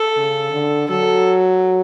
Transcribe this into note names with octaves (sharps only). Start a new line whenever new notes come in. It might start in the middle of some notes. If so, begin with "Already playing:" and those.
Already playing: A4
C#3
D3
F#3 A4